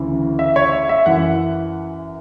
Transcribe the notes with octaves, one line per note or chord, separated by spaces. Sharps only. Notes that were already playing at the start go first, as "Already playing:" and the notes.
Already playing: D2 C#3 E3
E5
C#5
E5
E5
F#2 E3 F#5